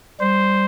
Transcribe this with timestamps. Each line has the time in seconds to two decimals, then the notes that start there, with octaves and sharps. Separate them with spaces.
0.20 G3 C5